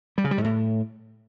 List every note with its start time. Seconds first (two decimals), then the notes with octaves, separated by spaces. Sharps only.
0.18 G3
0.24 C#3
0.31 G3
0.38 G#2
0.44 A2